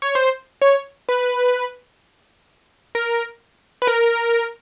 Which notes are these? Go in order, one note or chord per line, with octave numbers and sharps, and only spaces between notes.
C#5
C5
C#5
B4
A#4
B4
A#4